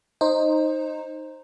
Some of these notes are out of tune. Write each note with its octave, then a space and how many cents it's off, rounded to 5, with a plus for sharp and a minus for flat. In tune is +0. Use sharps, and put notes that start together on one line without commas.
D#4 -5 C5 +15